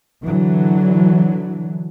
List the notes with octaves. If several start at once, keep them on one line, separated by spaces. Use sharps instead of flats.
D3 E3 F#3